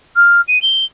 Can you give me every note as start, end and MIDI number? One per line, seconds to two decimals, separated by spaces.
0.16 0.41 89
0.48 0.61 99
0.62 0.84 103